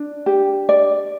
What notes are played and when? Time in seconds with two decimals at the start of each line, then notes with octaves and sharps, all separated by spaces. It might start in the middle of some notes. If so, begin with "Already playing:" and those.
Already playing: D4
0.26 G4
0.69 D5